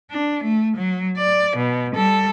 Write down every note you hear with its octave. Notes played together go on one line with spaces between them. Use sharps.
D4
A3
F#3
D5
B2
G3 A4